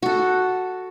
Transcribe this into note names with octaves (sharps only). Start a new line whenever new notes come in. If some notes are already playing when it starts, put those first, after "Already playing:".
F#4 A4